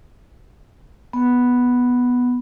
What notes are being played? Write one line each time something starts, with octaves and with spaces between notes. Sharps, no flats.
B3